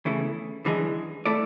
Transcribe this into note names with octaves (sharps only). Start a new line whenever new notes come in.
E2 C#3 E3 A3 E4
F#2 E3 G#3 D4 G#4
A3 E4 A4 D5